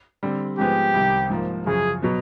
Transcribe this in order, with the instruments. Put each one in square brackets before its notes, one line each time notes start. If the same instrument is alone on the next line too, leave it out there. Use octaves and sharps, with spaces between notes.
[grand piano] D3 G3 C4
[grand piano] G#2 F3 G#3 B3 [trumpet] G4
[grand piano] C2 C3 D#3
G#2 F3 A#3
[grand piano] F#2 C#3 F3 [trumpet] G#4
[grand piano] B2 F#3 B3